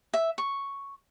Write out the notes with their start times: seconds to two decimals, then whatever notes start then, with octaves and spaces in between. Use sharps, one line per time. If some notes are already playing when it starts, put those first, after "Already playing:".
0.14 E5
0.38 C#6